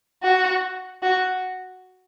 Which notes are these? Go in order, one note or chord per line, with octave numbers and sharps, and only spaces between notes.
F#4
F#4